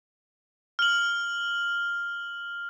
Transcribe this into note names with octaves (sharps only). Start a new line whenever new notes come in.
F6 F#7